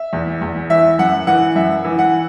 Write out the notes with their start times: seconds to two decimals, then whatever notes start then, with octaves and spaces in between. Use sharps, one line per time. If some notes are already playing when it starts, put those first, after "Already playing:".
Already playing: E5
0.13 E2
0.42 E2
0.70 E3 E5
0.99 F#2 F#5
1.27 E3 F#5
1.55 F#2 E5
1.84 E3
1.99 F#5